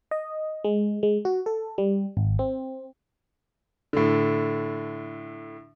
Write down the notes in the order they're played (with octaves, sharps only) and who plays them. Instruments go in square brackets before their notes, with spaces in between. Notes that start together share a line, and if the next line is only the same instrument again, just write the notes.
[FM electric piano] D#5
G#3
G#3
F#4
A4
G3
G#1
C4
[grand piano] A2 D3